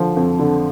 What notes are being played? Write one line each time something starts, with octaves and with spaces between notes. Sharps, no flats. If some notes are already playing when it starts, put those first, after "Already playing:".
Already playing: D3 F3
F2
D3